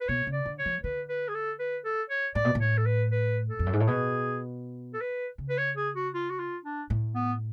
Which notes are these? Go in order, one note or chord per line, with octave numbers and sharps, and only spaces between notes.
B4
B2 C#5
C#3
D5
D3
C#5
F3
D3 B4
B4
G#4
A4
B4
A4
C#5
A2 D5
B2
A2
C#5
A4
B4
B4
A4
F2
F#2
G#2
A2
B2 G#4
A4
B4
C#3
B4
C#5
G#4
F#4
F4
F#4
F4
D4
A2
B3